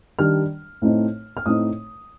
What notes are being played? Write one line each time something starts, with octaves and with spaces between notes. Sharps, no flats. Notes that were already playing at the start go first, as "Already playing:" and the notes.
D#3 G3 D4 F6
A2 A3 C4 D#4
F6
A2 A3 C4 D#4 D#6